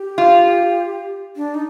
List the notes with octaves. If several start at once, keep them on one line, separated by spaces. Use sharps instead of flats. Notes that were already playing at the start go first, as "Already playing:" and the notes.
Already playing: G4
F4
D4
D#4